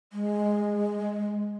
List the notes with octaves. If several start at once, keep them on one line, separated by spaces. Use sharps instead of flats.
G#3